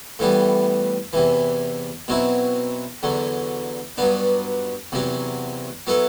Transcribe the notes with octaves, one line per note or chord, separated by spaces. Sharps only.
A2 E3 G3 B3
E2 C3 E3
B2 F#3 C4 E4
E2 D3 F#3
G2 F#3 B3 D4
E2 C3 F#3 C4
F#3 B3 E4 A4